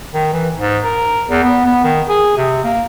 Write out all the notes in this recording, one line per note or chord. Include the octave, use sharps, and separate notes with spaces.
D#3
E3
G#2
A#4
E2
B3
B3
D#3
G#4
C3
A#3